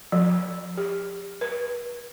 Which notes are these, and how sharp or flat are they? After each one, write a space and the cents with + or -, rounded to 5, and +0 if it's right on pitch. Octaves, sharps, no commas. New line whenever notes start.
F3 +30
G4 +30
B4 -40